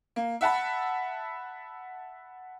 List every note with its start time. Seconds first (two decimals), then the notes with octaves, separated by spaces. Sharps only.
0.16 A#3
0.41 E5 F#5 A5 B5